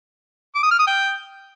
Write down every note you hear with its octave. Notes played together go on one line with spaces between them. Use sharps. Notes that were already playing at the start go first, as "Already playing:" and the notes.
D6
D#6
F6
D#6
G5